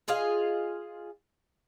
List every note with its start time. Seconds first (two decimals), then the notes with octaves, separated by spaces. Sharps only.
0.08 F4 G#4 D#5 F5